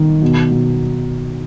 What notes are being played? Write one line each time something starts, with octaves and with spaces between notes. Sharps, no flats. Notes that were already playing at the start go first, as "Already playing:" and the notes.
Already playing: D#3
B2
B2